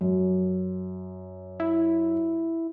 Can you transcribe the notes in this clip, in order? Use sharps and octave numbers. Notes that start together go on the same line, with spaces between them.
F#2
E4